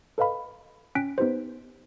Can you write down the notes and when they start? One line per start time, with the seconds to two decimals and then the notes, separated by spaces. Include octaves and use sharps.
0.18 A4 B4 D#5 F5 B5
0.95 C#4 G5 G#5 F#6 B6 D7
1.18 B3 D#4 G4 B4 C5